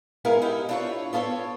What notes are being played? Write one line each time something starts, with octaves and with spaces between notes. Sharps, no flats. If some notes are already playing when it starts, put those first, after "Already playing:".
G#3 B3 E4 A#4 F5 G#5
D#4 E4 G4
D4 E4 F4 G#4 B4 C#5
B3 F4 A4 C#5 D5